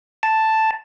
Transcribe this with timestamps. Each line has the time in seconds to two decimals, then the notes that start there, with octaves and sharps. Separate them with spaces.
0.23 A5